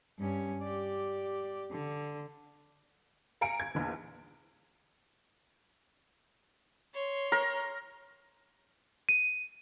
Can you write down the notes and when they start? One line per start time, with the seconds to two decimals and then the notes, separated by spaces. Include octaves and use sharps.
0.19 G2 C#4
0.62 G4 D5
1.71 D3
3.41 F5 G#5 A#5 C#7 D7
3.60 G#6
3.75 A#1 E2
6.94 C#5 C6
7.32 A#4
9.09 D#7